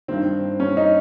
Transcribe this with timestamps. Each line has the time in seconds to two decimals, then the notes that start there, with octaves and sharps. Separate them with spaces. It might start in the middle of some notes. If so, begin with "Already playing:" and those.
0.08 G2 D#3 C4
0.60 C#4
0.77 D#4